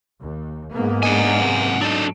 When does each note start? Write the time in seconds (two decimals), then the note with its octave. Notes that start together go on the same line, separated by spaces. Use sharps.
0.20 D#2
0.71 G#2 A#3 B3
1.03 D4 D#5 F#5 G#5
1.40 F#2 C3
1.81 F#3 D4 D#4 A4